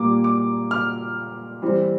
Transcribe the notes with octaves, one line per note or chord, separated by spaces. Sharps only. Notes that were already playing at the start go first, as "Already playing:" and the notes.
Already playing: A#2 G3 A#3 D6
D6
F6
E3 G3 C4